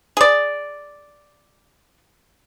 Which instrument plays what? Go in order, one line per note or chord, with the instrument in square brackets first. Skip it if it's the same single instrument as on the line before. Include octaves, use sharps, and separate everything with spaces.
[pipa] G#4 D5